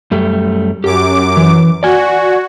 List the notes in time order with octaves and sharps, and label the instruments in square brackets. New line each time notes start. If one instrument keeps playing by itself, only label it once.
[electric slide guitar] F#2 G3 A3
[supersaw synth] F#2 D6 [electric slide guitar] G4
[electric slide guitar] E3
[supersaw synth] F#4 [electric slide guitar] D5 G#5